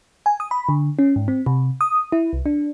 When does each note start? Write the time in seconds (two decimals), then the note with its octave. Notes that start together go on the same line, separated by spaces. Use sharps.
0.26 G#5
0.40 D#6
0.51 B5
0.69 D3
0.99 C#4
1.16 G#2
1.28 C4
1.46 C3
1.81 D#6
2.12 E4
2.33 C2
2.46 D4